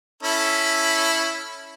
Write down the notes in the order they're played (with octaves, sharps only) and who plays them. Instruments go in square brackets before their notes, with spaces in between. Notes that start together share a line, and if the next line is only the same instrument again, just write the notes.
[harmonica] C#4 E4 A4